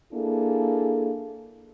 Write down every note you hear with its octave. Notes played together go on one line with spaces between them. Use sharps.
A#3 D4 E4 G#4 A4